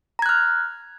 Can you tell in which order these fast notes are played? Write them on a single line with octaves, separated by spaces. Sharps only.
A#5 G#6 F#6 F6